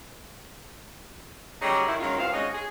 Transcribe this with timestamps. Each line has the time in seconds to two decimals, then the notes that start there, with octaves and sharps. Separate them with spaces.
1.61 C#3 F#3 G3 D#4 G#4 A4
1.87 D#3 E4
2.00 D#3 F#3 G#3 A#3 C#4 F4
2.18 G2 C4 E4 F5
2.32 G#3 C#4 D#4 F#4 C#5 D#5
2.54 G#4